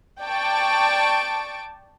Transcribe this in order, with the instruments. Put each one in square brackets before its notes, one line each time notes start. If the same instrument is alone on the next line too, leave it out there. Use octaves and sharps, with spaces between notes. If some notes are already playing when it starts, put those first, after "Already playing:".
[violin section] D5 G5 A5 C#6 D7